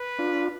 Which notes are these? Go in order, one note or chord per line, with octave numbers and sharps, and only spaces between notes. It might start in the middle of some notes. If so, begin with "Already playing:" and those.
Already playing: B4
D4 F4